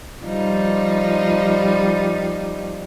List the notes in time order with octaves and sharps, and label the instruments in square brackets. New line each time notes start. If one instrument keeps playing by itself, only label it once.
[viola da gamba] F3 G3 D#4